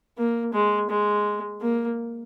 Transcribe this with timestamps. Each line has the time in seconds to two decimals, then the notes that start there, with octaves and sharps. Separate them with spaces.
0.18 A#3
0.53 G#3
0.90 G#3
1.62 A#3